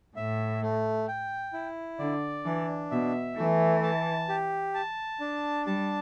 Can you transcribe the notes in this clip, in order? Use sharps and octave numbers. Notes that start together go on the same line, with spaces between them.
A2 E5
A3
G5
E4
D3 D5
E3 D4
B2 E5
E3 A3
A5
G4
A5
D4
G3 A5